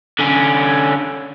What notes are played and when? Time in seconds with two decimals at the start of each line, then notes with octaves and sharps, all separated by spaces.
0.19 D3 C#4